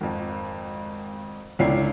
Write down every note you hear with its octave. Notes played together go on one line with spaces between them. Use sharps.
G#1 F2
G1 C#2 C#4 E4 D5 C7